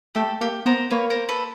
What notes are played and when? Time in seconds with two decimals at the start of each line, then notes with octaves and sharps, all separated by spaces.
0.15 A3 G4 A4
0.41 A#3 G4
0.66 B3 A#4 C5
0.91 A#3 B4 C#5
1.10 A#4 C5
1.29 A4 B4